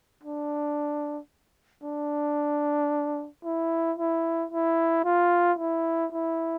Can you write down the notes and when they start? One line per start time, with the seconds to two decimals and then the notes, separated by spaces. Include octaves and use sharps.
0.24 D4
1.84 D4
3.45 E4
3.98 E4
4.51 E4
5.05 F4
5.59 E4
6.12 E4